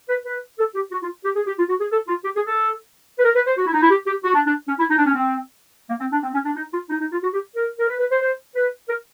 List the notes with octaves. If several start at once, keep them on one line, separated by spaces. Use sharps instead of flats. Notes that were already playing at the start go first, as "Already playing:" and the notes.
B4
B4
A4
G4
F#4
F4
G4
G#4
G4
F4
F#4
G#4
A4
F4
G4
G#4
A4
B4
A#4
B4
C5
F#4
E4
D#4
E4
G4
G4
F#4
D4
D4
C#4
E4
D#4
D4
C#4
C4
A#3
C4
D4
C4
C#4
D4
D#4
F4
D#4
D#4
F4
F#4
G4
A#4
A#4
B4
B4
C5
C5
B4
A#4